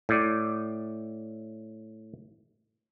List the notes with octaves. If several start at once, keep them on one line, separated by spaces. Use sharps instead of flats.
A2 D5